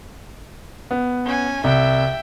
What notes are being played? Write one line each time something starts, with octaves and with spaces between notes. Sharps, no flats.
B3
C#4 G#5
C2 E5 G5